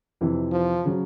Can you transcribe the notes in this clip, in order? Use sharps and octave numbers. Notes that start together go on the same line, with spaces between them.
F2 C3 E3
F3
C#3 F#3